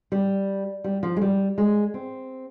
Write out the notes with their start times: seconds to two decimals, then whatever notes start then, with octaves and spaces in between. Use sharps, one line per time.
0.12 G3
0.84 G3
1.03 F3
1.17 G#3
1.22 G3
1.58 G#3
1.94 C4